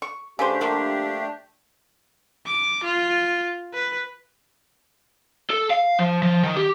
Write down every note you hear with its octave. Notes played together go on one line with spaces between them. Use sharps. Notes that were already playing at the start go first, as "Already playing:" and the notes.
C#6
C#3 A3 D4 G4 B4 C5
D3 F3 A#3 E5
D6
F4
B4
A4
F5
F3
F3
D#3
G4